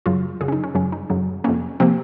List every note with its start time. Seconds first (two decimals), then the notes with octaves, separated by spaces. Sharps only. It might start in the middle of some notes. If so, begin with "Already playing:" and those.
0.06 F#2 C#3 F#3 F4
0.40 F#2 C#3 F#3 G#4
0.48 C#4
0.52 D#4
0.64 C#4
0.74 F#2 C#3 F#3 C#4
0.92 D#4
1.10 F#2 C#3 F#3
1.44 F2 C3 F3 A#3 C#4
1.80 C3 F3 A#3 C4